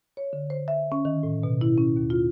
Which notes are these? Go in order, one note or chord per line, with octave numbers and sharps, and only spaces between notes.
C#5
D3
C5
E5
C#4
D#3
A2
B2
E4
C#4
D#2
F4